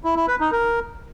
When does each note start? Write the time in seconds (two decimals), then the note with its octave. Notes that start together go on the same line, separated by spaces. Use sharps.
0.04 E4
0.16 E4
0.28 B4
0.40 D#4
0.52 A#4